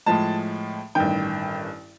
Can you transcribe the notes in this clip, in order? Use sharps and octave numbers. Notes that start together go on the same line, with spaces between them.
A2 F3 G#3 A5
A1 G2 D#3 G5